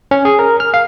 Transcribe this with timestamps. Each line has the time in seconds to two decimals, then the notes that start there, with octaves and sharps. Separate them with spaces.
0.11 C#4
0.25 G#4
0.39 A#4
0.60 F6
0.74 F5